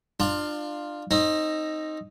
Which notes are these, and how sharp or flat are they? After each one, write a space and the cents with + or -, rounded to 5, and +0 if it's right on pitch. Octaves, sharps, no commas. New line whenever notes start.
D4 +30 F4 +0
C4 +25 D#4 +0